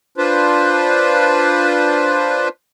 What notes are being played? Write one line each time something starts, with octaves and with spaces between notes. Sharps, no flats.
D4 F4 B4 C5